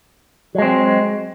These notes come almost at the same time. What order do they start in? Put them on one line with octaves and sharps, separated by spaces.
F#3 G#3 C4